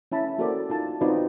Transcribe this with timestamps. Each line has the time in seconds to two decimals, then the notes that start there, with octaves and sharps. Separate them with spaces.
0.12 C#4 E4 A5 B5
0.38 A#3 F#4 A4 A#4 C5 D5
0.70 D#4 F4 A5
1.01 C4 D#4 F4 F#4 B4 D5